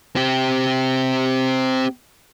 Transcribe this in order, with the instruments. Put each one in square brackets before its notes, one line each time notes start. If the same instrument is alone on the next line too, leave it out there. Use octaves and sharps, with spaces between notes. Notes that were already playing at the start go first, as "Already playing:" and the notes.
[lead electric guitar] C4 G4